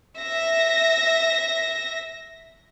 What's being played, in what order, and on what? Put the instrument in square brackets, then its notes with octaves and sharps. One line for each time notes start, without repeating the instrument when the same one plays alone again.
[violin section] E5 A#6